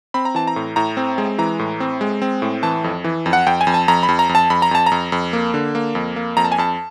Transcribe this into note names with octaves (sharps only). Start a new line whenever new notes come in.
C4 B5
A#5
E3 A5
A#5
A2
A2 A#5
C4
G#3
E3 A#5
A2
C4
G#3
C4
A2
E3 A5
F2
E3
F2
F#5
F2 G5
G#5
F2
A5
F2 A#5
B5
F2
A#5
F2
A5
F2 B5
A#5
F2 A5
A#5
F2
F2
A#3
D3
A#3
F2
A#3
F2 A#5
A5
G#5
F2 A5